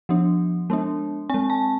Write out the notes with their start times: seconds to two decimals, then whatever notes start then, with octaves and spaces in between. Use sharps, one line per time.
0.09 F3 B3 D4
0.70 G#3 B3 D4
1.30 C4 G#5
1.34 G#3
1.50 A5